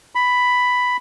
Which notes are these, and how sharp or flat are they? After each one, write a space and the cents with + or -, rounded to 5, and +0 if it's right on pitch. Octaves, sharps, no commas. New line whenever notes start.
B5 +5